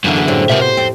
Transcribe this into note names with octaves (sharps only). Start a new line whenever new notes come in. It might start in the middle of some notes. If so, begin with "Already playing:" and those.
F#2 D3 E3 A#3 B3
F#4 G#4 B4
A2 G3 C4
C3 F#3 B3 G4 A#4 E5
C5
F2 C4